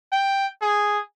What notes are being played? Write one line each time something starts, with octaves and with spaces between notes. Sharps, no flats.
G5
G#4